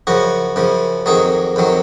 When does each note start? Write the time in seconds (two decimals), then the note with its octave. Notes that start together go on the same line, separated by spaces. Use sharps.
0.07 F#2 C#3 F3 F#4
0.56 F#2 C#3 F3
1.06 F2 D#3 F#3 G#4
1.56 F2 D#3 F#3